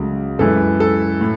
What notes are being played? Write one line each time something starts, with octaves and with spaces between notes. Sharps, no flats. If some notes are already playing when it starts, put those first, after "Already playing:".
Already playing: C#2 C#3 F#3 A3
F#2 E3 G#3 A4
A4
A2